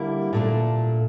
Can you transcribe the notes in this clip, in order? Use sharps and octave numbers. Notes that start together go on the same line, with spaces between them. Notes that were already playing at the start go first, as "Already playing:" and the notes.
Already playing: D3 G3 A#3 E4
A#2 A3 D4